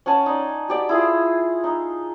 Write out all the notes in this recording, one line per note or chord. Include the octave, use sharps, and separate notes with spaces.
C#4 F#5 G#5 A5
D#4 D5
F#4 G4 D5
E4 F4 G#4 D#6
D#4